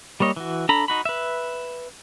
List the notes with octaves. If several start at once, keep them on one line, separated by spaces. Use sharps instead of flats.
G3 A#3 C#5 D#5
E3 F#4
D4 A4 A#5 B5
D#4 F#4 B5
B4 E5